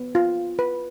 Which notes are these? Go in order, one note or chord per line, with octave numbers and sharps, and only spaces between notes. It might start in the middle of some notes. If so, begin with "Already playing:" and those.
Already playing: B3
F4
B4